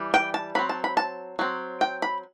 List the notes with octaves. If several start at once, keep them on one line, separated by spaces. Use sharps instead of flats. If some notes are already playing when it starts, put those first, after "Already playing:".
Already playing: E3 G3
G5
A5
F#3 C4 B5
A5
B5
A5
F#3 C4
G5
B5